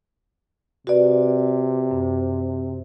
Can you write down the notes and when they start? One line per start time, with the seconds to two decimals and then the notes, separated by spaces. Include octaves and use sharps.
0.87 C3 F#4 B4 D5
1.91 F#2